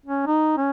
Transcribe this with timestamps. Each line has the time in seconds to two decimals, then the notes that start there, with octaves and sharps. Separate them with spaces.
0.06 C#4
0.26 D#4
0.57 C#4